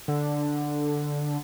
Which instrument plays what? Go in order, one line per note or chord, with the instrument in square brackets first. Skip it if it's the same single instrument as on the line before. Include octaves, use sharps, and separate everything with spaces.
[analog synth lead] D3